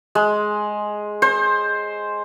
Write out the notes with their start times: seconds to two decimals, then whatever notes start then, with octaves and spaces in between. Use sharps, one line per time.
0.15 G#3
1.22 C5